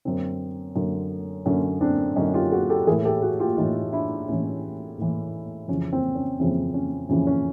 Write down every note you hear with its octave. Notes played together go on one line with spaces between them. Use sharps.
F#2 D3 C4
F#2 D3
F#2 D3 C#4
C4 D4
F#2 D3 C#4 D#4
F4 G4
F#4 G#4
G4 A4
A2 E3 G#4 A#4
G4 A4
F#4 G#4
F4 G4
A2 E3 D#4 F4
D4 E4
A2 E3 C#4
A2 E3
F2 C#3 E3 C#4
C4
C#4
F2 C#3 E3 C4
C#4
F2 C#3 E3 C#4
C#4